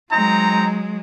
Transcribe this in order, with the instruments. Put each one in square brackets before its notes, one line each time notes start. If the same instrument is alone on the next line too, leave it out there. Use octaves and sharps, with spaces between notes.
[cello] F#3 G#3 [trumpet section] C4 D#4 A#5